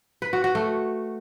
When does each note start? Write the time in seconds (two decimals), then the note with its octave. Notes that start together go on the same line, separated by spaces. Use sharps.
0.22 B4
0.33 F#4
0.44 F#4
0.55 A3